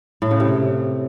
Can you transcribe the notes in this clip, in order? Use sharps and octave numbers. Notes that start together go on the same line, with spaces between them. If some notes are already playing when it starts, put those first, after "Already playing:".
A2
C#3
C3